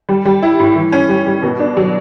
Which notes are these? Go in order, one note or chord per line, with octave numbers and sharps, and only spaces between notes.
G3
G3
E4
A2
E3
C#4
G3
G3
B2
D4
F#3